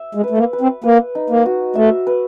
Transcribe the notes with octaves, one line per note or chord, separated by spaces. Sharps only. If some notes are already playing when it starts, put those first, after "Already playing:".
Already playing: E5
G#3
B4
A3
A#3
B4
C4
A#3 B4
D#4
A#3
F#4
A3 E5
B4